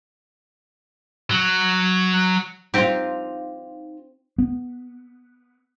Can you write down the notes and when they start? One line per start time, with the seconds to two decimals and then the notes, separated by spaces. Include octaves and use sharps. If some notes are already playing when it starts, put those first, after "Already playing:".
1.31 F#3
2.74 C4 D#4 F4 G4
4.38 B3